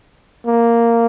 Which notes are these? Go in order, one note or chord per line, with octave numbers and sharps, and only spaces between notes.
A#3